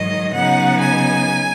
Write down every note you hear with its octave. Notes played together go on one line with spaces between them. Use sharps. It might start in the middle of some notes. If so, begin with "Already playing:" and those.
Already playing: G#2 D#3 F#3 D#5
C#3 F#3 B3 D#4 F#5
G#5